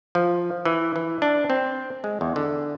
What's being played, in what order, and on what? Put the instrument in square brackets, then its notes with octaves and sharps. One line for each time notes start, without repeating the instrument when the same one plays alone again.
[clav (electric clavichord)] F3
E3
E3
D4
C4
G#3
E2
D3